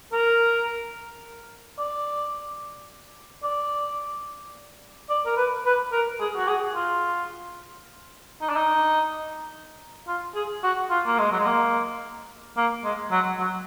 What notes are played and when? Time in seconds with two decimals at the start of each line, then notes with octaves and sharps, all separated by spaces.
0.12 A#4
1.78 D5
3.43 D5
5.09 D5
5.26 A#4
5.37 B4
5.65 B4
5.92 A#4
6.20 G#4
6.36 F#4
6.48 G#4
6.75 F4
8.41 D#4
8.49 D4
8.56 D#4
10.08 F4
10.35 G#4
10.63 F#4
10.91 F4
11.06 A#3
11.18 G#3
11.32 F#3
11.39 G#3
11.46 A#3
12.57 A#3
12.84 G#3
13.11 F#3
13.40 F#3